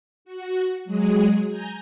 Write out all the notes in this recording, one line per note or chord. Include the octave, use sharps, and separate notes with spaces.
F#4
F#3 G#3 G#4
G#5 A#5 G6